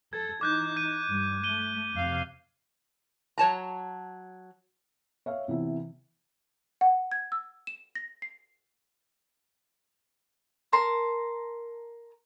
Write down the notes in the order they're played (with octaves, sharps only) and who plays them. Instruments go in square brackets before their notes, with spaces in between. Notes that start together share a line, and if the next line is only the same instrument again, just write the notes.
[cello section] A4 [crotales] G#6
[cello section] E3 D#4 [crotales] D6 F#6 G6
[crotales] G6 D#7
[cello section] G2 G3
[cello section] A3 [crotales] D#7 G7
[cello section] F2 C3 F5
[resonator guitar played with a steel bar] F#3 C#5 A5 A#5
[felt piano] C#5 E5 F5
C3 E3 B3 E4
[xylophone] F#5
G#6
E6
E7
A#6
C7
[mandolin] A#4 A5 A#5 C6